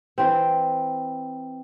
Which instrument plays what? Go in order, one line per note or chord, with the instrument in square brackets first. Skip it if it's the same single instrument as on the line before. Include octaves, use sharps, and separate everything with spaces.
[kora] E3 C4